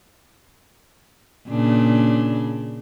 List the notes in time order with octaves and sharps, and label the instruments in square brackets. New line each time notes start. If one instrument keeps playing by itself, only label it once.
[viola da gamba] A#2 C#3 D4